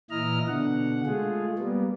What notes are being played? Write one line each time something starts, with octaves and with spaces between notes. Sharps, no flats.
A#2 E3 E4 D#5 A#5 F6
B2 D3 F#5
G#3 A3 F4 G#4
G3 A#3 B3